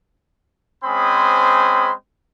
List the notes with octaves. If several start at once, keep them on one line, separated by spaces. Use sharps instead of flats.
G#3 C4 C#4 C5 B5 D#6